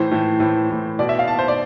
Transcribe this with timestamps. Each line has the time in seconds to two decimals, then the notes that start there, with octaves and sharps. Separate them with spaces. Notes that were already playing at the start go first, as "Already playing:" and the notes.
Already playing: A2 E3 C5
0.11 A2 E3
0.40 A2 E3
0.70 A2 E3
0.99 B2 D5
1.09 E5
1.19 F5
1.28 B2 A5
1.39 C5
1.48 D5